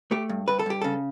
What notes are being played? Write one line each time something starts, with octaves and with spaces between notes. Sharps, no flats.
A3 G4
G2
G2 B4
A4
G2 G4
C#3 A4